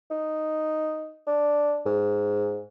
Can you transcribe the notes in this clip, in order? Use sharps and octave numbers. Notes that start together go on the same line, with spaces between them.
D#4
D4
G#2